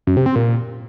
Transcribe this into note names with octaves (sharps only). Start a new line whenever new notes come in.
F#2
C3
C4
A#2